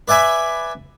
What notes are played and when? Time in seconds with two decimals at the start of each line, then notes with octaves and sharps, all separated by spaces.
0.08 B4 D5 E5 G#5 B5